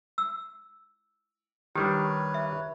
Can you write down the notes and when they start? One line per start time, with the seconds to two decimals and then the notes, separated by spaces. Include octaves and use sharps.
0.18 E6
1.76 D#3 G3 D4 G4 B4 C#5
2.34 E5